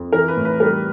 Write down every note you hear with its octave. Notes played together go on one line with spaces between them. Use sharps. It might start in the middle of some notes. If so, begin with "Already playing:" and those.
Already playing: F2
E3 A#4
B4
A2
B4
G3 A#4